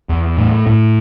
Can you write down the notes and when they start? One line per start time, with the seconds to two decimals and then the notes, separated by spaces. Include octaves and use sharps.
0.09 E2
0.38 A2
0.67 A2